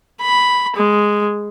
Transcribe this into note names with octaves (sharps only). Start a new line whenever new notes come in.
B5
G#3